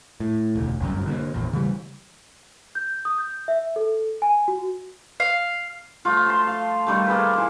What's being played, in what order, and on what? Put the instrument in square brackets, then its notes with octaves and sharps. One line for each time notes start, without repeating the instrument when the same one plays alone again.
[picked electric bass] A2
E1 D2
G1 C2 F#2
D3 A3 A#3
G#1 E2 A#2
C#3 E3 G3
[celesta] G6
D#6
G6
E5
A4
G#5
F#4
[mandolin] F5
[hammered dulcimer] F3 A3 F4
A5 C6
F5
D#3 G3 A3
A#3 G#4 A4 B4
E3 C6 D6